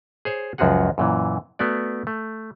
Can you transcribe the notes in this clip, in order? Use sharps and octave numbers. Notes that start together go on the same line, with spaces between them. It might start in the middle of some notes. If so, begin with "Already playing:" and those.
G#4 C5 C#5
C#2 F#2 F3 F#4 G#4 F#5
F#2 A#2 E3
A3 B3 F#4 D5
A3